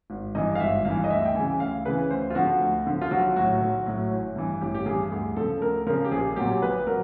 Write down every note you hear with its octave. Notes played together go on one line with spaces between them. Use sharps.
G#1
G2 E3 D#5
F5
G#1 E5
G2 E3 F5
D#5
D2 E5
G5
C#3 E3 G#5
D2 F5
C#3 E3 B4
D2 C5
F4
D3 F3 F#4
D2
D3 F3
F4
B1 F#4
A2 F#3 F#4
B1
A2 F#3
A1
G2 E3
A1 G4
G4
G2 E3 G#4
D2 G#4
C#3 F3 A4
D2 A#4
C#3 F3 A#4
G4
A#1 G#4
A#2 F#3 G4
A#1 B4
F#3 A#4